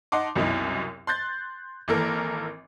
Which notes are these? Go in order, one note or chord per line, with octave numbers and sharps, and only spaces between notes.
D#4 F#5 A5 C6 D6
C2 F#2 B2 D#4 E4
C6 F#6 G6 A6
G#1 E3 A#3 A4 A#4